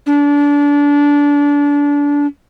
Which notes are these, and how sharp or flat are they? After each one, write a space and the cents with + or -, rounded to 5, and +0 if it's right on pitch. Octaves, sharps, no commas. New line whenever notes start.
D4 -25